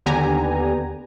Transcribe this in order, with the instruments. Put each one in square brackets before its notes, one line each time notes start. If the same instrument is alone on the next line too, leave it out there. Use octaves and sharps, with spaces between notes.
[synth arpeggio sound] D#2 D3 B3 G4 G#5 A#5